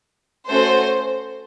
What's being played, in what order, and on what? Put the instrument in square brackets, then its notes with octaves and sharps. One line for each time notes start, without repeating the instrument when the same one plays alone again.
[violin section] A3 C#4 F#4 A4 C5